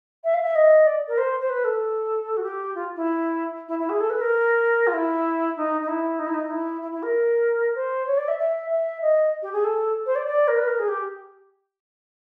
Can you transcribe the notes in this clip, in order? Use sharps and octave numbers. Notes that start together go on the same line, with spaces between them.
E5
F5
E5
D#5
D5
A#4
C5
C5
B4
A4
F#4
G4
F4
E4
E4
E4
G#4
A4
B4
A#4
F4
E4
D#4
D#4
E4
D#4
E4
D#4
E4
E4
E4
A#4
C5
C#5
D5
E5
E5
E5
D#5
G4
G#4
A4
C5
D5
D5
A#4
B4
A#4
G#4
G4